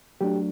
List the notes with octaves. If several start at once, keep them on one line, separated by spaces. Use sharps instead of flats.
F#3 A3 D4 G4